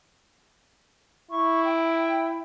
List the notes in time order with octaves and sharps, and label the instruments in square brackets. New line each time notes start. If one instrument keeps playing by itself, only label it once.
[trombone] E4 [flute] C#6
[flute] G5